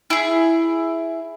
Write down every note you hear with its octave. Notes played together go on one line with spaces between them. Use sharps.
E4 G#4